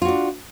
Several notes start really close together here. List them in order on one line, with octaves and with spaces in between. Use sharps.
F4 F#4 D4